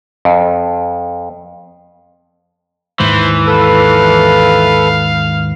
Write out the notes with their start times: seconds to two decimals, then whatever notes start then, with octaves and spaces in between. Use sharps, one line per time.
0.25 F2
3.00 D#2 G#2 E3 C5
3.47 A4 B4 F5